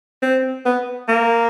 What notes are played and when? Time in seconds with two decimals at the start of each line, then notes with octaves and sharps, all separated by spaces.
0.22 C4
0.65 B3
1.08 A#3